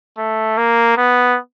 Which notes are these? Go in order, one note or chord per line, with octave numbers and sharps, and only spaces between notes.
A3
A#3
B3